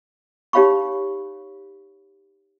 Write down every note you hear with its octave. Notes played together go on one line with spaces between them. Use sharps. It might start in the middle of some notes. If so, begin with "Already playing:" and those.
D#4 G4 C#5 F5 B5 C#6